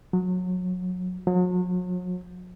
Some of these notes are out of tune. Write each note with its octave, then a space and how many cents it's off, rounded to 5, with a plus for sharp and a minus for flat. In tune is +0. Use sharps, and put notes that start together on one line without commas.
F#3 -25
F#3 -40